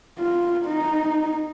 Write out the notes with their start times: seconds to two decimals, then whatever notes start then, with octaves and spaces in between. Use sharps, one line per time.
0.19 F4
0.66 D#4